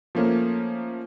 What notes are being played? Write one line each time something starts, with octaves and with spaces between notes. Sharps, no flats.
F3 A3 A#3 C#4